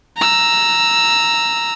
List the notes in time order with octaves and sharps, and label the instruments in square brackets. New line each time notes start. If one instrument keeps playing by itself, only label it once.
[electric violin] A#5 E6